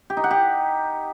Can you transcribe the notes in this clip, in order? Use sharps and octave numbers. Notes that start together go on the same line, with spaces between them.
G4
D#4
F#5
G4